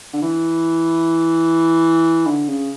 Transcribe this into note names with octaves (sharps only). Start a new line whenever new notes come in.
D3
E3
D3
C#3